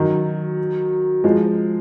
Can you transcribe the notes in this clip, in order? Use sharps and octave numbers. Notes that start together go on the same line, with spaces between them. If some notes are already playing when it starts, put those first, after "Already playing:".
Already playing: D#3 F#3
F3 G#3